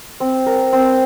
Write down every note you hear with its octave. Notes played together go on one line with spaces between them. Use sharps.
C4
A#4
C4